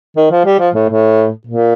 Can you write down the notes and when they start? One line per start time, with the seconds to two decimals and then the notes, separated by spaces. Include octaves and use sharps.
0.16 D#3
0.31 F3
0.45 G3
0.59 F3
0.74 A2
0.89 A2
1.47 A#2